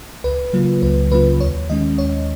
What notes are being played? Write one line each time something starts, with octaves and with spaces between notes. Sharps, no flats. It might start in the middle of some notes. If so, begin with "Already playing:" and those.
C#2 B4
C#3 F#3 A#3 F4
C#2 B4
C#3 F#3 A#3 F4 B4
D#2 C#5
D#3 G#3 C#4 D#5
D#2 C#5